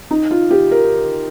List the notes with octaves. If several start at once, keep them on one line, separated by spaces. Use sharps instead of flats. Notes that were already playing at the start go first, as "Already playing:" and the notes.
D#4
F4
G4
A#4